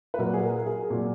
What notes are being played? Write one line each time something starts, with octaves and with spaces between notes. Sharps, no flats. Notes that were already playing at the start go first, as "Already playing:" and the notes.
B4
A#2 F#3 A#4
G#4
A#4
A#4
G#4
A#2 F#3